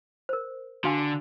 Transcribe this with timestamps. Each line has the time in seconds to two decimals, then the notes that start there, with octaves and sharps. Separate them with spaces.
0.29 A#4 C5
0.84 D3 F#4 F5 G#5